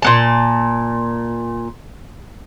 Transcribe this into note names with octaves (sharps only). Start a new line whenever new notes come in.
A#2 B3 A5